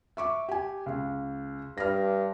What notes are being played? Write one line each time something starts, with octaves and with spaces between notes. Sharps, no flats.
E5 C#6 D6
G4 G#5
C#2
G2 F6 A#6